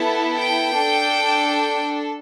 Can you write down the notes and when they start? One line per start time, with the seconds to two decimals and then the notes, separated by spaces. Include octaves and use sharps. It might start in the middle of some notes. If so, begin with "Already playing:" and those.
Already playing: B3 E4 A4 A5
0.39 G5
0.73 D4 A4